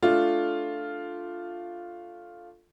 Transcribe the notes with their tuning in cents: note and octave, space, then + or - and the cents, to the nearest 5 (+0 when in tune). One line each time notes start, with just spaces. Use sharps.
A3 +0 D4 +0 F4 +0